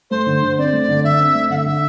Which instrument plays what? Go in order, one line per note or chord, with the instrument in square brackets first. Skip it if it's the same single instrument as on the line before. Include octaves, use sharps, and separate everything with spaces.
[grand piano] A3 [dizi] C5
[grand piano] D3
D3
[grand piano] C4 [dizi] D5
[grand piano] A3
D3
[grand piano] D3 [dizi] E5
[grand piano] C4
A3
[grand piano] D3 [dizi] F#5
[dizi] E5
[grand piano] D3